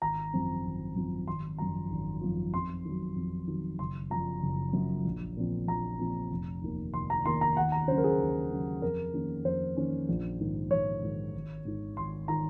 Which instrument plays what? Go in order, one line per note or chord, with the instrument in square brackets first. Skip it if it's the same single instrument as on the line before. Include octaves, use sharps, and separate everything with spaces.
[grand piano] G#1 A#5
F#2 F3 C4
G#1
F#2 F3 C4
G#1 C6
F#2 F3 A#5
G#1
F#2 F3
F2 C6
D#3 F#3
F2
D#3 F#3
F#1 C6
F#2 F3 A#5
F#1
F#2 F3
A#1
A#2 F3 C4
A#1 A#5
A#2 F3 C4
F1
D#2 D#3 A#3
F1 C6
A#5
D#2 D#3 A#3 C6
A#5
D#2 F#5
A#5
C#3 F#3 C#4 C5
A#4
G#4
D#2
C#3 F#3 C#4
F2 A#4
D#3 A#3 C#4
F2 C5
D#3 A#3 C#4
A#1
G#2 D#3
A#1 C#5
G#2 D#3
G#1
G#2 D#3
G#1 C6
D#3 A#5